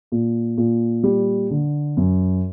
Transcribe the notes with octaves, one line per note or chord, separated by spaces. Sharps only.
A#2
A#2
G3
D3
F#2